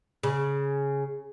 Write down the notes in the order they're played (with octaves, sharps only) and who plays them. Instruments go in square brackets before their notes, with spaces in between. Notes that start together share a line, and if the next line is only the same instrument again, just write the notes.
[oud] C#3